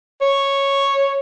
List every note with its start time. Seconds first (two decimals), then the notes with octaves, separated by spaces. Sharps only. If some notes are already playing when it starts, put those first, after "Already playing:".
0.21 C#5